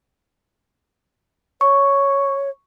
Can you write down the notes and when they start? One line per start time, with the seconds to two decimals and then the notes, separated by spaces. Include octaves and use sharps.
1.61 C#5 C#6